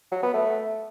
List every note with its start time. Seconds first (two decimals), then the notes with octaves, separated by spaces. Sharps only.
0.12 F#3
0.23 B3
0.34 A3